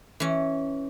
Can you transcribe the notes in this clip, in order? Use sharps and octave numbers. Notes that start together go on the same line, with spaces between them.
E3 C#4